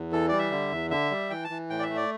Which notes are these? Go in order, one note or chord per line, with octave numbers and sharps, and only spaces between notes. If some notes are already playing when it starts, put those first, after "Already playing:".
Already playing: E2
E3 A4
G3 D5
E5
D3
E2
D3 E5
G3
E3 G5
A5
E3
A2 G5
D5
E5
A3
D5